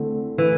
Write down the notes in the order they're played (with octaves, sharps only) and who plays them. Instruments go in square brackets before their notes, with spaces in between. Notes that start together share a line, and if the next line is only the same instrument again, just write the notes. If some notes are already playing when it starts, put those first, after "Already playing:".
Already playing: [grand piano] D3 A3 C4 E4
[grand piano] D3 A3 E4 [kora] E3